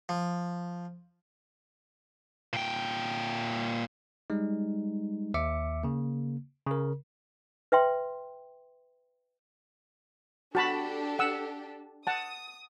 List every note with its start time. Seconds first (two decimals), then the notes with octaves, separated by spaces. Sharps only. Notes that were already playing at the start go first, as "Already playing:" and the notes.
0.09 F3
2.53 A#2 G5
4.30 G3 G#3 D#4
5.34 D#2 E5 D6 C#7
5.84 C#3 A#3
6.67 C#3 A#4
7.72 B4 E5 G5 C6
10.55 D4 F#4 G4 A4 A5 B5
11.19 F#5 E6
12.07 F#5 A5 D#6